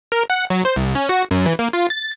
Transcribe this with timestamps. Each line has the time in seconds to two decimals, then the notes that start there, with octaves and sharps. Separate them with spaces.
0.12 A#4
0.30 F#5
0.50 F#3
0.65 C5
0.76 C2
0.95 C#4
1.09 F#4
1.31 F#2
1.46 E3
1.59 A#3
1.73 F4
1.90 A6